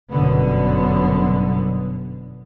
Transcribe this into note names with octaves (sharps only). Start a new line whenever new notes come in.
G1 F#2 B2 D3 B3